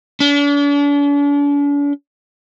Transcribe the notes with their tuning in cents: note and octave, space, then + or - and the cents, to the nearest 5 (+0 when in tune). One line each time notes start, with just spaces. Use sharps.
D4 -45